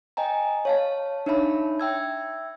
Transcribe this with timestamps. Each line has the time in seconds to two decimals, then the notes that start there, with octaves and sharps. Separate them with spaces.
0.17 D#5 G5 G#5 A#5
0.65 C#5 F5 A5
1.26 D4 D#4 C#5 E5 A5 B5
1.80 E5 G5 E6 G#6